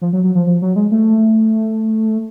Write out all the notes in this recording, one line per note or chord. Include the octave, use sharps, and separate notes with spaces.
F3
F#3
F#3
F3
F3
F#3
G#3
A3